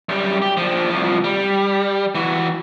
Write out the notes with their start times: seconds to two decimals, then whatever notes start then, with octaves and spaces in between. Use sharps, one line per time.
0.09 F#2 G3
0.42 G4
0.57 F3 D4
0.90 C2 F3
1.24 G3
2.15 E3 F#4